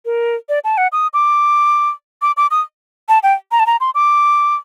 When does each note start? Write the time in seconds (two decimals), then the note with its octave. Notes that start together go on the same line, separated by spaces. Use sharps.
0.05 A#4
0.49 D5
0.64 A5
0.78 F#5
0.92 D#6
1.14 D6
2.22 D6
2.37 D6
2.51 D#6
3.09 A5
3.23 G5
3.52 A#5
3.60 A5
3.67 A#5
3.80 C6
3.95 D6